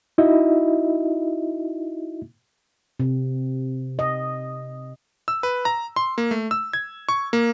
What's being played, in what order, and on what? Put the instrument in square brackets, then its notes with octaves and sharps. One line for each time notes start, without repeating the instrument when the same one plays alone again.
[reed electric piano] D#4 E4 F#4 D#5 E5
[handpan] C3
D#5
[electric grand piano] E6
B4
A#5
C6
A#3
A3
E6
G#6
C#6
A#3